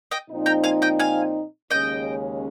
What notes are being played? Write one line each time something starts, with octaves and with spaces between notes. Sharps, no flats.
D#5 G5
A#2 F3 C4 D#4
G5 A#5
F5 G#5
D#5 G5
F5 G#5
D#2 C#3 G#3 C#4 D#5 G5